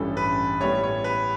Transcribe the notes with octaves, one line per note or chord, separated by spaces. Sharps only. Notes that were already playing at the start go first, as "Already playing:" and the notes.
Already playing: A1 G2 E3 G3 C#4 A4
B4
A2 G3 B3 C#5
C#5
B4